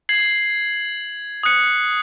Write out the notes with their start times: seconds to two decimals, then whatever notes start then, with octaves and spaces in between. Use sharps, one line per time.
0.09 G#6 C7 F#7
1.43 D#6 F#6 C#7